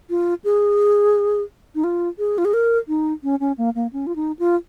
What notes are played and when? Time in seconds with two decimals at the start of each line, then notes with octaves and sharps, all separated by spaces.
0.10 F4
0.44 G#4
1.75 D#4
1.84 F4
2.19 G#4
2.38 F4
2.45 G#4
2.54 A#4
2.88 D#4
3.23 C#4
3.40 C#4
3.58 A#3
3.75 A#3
3.93 C#4
4.07 F4
4.16 D#4
4.39 F4